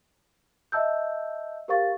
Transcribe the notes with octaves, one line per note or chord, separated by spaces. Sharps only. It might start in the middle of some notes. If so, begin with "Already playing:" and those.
D#5 E5 A5 E6 G6
G4 A#4 C5 F5 C#6 A6